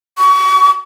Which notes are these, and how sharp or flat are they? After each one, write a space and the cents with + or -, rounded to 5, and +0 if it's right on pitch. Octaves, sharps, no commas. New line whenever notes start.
C#6 +35